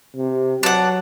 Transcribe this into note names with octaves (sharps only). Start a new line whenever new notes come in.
C3
F#3 D4 F#5